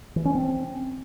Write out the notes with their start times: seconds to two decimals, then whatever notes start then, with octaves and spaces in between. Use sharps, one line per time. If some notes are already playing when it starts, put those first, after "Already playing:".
0.16 E3
0.25 C#4
0.35 C4